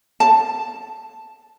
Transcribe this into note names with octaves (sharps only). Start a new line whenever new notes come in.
A5